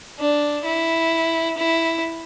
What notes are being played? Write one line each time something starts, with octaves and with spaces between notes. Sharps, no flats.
D4
E4
E4